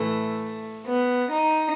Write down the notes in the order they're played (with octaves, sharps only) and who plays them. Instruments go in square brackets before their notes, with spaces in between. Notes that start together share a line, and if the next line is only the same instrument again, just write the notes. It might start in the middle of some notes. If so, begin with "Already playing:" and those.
Already playing: [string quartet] A2 E3 A3
B3
D#4